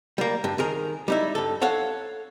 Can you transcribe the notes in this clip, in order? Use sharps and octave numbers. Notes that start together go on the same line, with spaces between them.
G3 A#3
G2
D#3 G#4 A#4
G3 D#4 E4
G2 A4
A4 C#5 F5 F#5